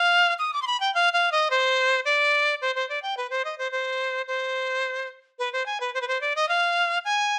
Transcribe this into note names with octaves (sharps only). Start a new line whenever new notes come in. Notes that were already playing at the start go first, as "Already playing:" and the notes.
Already playing: F5
D#6
D6
C6
B5
G5
F5
F5
D#5
C5
D5
C5
C5
D5
G5
B4
C5
D#5
C5
C5
C5
B4
C5
G#5
B4
C5
B4
C5
D5
D#5
F5
G#5